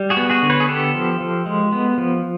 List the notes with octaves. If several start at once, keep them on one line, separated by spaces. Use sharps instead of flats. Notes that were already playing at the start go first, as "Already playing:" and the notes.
Already playing: G3
F#4 G#4
B3
F#4 G#4
D3
B4 C#5
G#4
B3 G4 A4
F3
F3
G#3
B3
F3